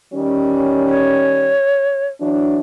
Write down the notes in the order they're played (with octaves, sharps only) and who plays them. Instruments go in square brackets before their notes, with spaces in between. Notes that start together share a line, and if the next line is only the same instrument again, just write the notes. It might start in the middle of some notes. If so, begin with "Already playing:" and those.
[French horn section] D#3 G3 C#4
[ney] C#5
[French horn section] E3 F#3 D4